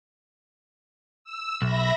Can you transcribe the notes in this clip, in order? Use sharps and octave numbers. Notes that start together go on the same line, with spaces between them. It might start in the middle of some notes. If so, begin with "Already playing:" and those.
E6
B1 E5 B5 A#6